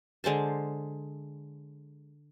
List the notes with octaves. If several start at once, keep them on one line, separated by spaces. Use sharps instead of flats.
D3 G#3 C5 A5